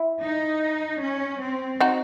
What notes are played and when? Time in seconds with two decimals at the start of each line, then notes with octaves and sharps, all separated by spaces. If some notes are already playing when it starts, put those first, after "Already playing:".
Already playing: E4
0.23 D#4
1.02 C#4
1.41 C4
1.81 D#4 F#4